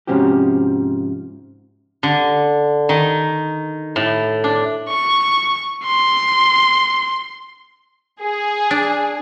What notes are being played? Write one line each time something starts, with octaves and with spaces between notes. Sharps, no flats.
G#2 C3 F3 C#4 F#4 G4
D3
D#3
A2
D4
C#6
C6
G#4
D4